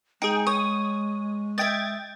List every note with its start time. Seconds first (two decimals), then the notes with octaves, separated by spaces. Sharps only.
0.22 G#3 D#4 G#4 G5
0.47 C#5 D#6
1.58 D#5 E5 G5 G#6 A6